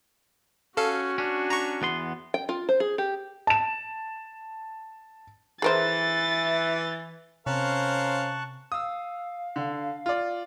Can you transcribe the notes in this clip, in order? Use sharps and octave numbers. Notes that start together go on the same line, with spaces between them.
C#4 F#4 A4 F5
C#4 D4
A#5 C#6
E2 B3 C6
G5
F4
C5
G#4
G4
A5 E7
E3 G#4 A#4 C5 A6
C3 C#4 A#4 C5 F5 A5 C#6 F#6
F5 D#6 E6
D3
F4 D5